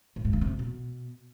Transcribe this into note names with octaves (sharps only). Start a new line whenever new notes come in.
A2
G#2
D3
C3
B2